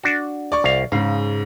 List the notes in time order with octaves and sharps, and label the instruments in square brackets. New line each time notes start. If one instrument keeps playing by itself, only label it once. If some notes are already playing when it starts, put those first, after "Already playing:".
[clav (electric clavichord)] D4 F#4
[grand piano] D5 C#6
[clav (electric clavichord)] C2 F5
[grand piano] G#2 C#3 [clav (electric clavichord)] F5